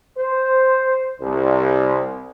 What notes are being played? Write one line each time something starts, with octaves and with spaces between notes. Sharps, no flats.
C5
C2